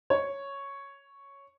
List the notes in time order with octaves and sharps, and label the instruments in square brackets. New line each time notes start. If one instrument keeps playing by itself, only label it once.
[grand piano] C#5